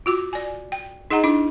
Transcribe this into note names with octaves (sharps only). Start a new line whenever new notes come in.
F4 F#4 D6
D5 G#5
G5
D#4 G#4 D#5 F#5 A#5
D4 E4 D6